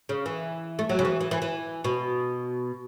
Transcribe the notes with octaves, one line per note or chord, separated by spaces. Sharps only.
C#3
E3
A3
F#3
C#3
E3
E3
E3
E3
B2